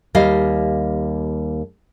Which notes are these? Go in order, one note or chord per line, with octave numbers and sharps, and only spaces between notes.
D#2 G3 D#5 F5